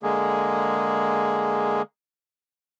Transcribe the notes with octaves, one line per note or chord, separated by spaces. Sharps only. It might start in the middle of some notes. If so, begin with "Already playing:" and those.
D3 G#3 A#3 G#4